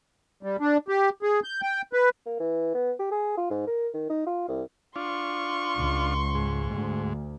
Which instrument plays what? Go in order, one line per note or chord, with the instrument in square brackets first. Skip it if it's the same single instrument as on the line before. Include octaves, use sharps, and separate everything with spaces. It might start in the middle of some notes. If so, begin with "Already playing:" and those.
[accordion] G3
D4
G4
G#4
G6
G5
B4
[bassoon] A#3
E3
B3
G4
G#4
F4
G#2
A#4
D#3
D#4
F4
C2
[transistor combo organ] D4 F4 [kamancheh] C6 C#6
[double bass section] C#2
[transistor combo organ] G#2
[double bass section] D2